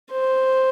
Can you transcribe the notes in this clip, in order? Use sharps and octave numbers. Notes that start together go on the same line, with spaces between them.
C5